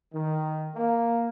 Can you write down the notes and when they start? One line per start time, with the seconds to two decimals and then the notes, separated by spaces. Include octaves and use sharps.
0.14 D#3
0.75 A#3